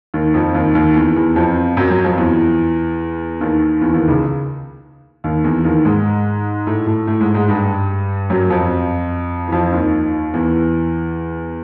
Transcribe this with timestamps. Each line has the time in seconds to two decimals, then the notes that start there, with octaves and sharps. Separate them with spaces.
0.14 D#2 D#3
0.34 F2 F3
0.55 D#2 D#3
0.75 D#2 D#3
0.95 E2 E3
1.16 E2 E3
1.36 F2 F3
1.77 F#2 F#3
1.90 F#2 F#3
2.04 F2 F3
2.18 E2 E3
3.41 D#2 D#3
3.81 E2 E3
3.94 D#2 D#3
4.08 C#2 C#3
5.24 D#2 D#3
5.44 E2 E3
5.64 D#2 D#3
5.85 G#2 G#3
6.67 A2 A3
6.86 A2 A3
7.07 A2 A3
7.21 G#2 G#3
7.34 G#2 G#3
7.49 G2 G3
8.30 F#2 F#3
8.50 F2 F3
9.48 E3
9.52 F2 F3
9.72 D#2 D#3
10.34 E2 E3